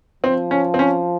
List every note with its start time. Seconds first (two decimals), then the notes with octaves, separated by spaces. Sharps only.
0.24 F3 C4
0.51 C#4
0.74 C4
0.79 C#4